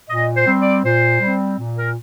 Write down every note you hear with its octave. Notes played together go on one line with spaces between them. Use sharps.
A#2 D#5
C5
G3 C4
D5
A#2 C5
G3 C4
A#2
A#4